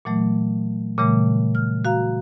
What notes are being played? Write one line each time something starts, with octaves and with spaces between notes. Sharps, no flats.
A#2 E3 F#3 A3
A#2 C#3 E3 G3 A3
F6
F#4 F5 A#5